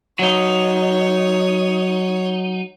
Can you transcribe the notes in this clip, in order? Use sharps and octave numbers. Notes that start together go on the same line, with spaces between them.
F#3 D#4 C#5